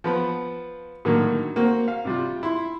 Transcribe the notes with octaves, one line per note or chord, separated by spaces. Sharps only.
F3 B3 B5
A2 D3 D#3 F#3 A#3
A#3 C4 F#4
F5
C3 G3 F4
E4 C6